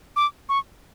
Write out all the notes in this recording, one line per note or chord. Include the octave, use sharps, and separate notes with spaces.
D6
C#6